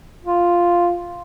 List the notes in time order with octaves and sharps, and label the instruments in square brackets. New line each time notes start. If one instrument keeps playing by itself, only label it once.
[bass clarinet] F4